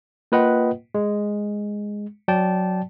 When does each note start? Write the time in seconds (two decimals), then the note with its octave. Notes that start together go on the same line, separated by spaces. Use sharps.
0.32 A#3 F4 B4 D#5 F#5 G5
0.95 G#3
2.28 F#3 D5 G5 A5